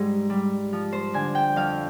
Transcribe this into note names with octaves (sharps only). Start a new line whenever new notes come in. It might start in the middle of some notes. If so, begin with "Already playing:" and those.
Already playing: G#2 G3
G3
F3
C5
D3 G#5
G5
F2 F5